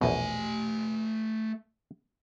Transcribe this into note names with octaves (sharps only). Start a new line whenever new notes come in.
A#1 E2 B2 A3 G#5